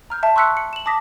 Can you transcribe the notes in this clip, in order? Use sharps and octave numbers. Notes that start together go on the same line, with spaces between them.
A#5 F6 G6
E5 A5
C6 C#6 E6 F#6 B6 C#7
C#7
E7 F#7
A5 D6 D#6 A#6 B6